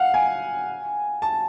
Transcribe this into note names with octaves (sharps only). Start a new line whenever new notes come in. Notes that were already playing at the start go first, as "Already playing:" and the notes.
Already playing: F5 F#5
G#5
A5